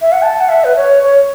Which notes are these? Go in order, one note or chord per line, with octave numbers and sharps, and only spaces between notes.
E5
F#5
A5
F#5
E5
B4
C#5
C#5